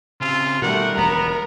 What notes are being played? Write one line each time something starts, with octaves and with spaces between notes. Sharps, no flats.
C#3 C4 F4
B2 D#3 G3 A3 A#4 F#5
E1 D2 B3 A#5